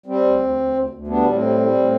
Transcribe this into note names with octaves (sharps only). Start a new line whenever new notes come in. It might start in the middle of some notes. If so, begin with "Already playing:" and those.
G3 C4
D2
D2
D2
D2
D2
G3 B3 D4
A2
C4
G3
G3
A2